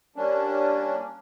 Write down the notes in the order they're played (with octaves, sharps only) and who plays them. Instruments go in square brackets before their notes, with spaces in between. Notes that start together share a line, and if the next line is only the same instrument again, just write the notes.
[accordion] G3 A#3 C#4 D4